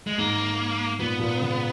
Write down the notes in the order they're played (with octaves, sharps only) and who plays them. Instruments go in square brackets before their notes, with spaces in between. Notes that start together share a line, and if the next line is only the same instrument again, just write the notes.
[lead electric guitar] G#3
[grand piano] G#2 [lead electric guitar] A#3
[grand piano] A#2 [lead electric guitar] B3
[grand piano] A#2
C#3